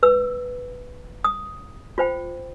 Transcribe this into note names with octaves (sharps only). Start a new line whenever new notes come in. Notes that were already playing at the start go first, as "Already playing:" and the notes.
B4 E6
D#6
F4 C5 G5